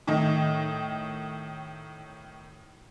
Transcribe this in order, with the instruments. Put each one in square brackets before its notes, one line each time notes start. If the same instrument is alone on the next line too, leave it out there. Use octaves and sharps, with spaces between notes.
[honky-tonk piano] A2 D#3 D#5